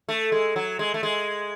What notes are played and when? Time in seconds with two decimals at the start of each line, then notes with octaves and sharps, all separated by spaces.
0.09 A3
0.32 G#3
0.56 F#3
0.79 G#3
0.94 A3
1.03 G#3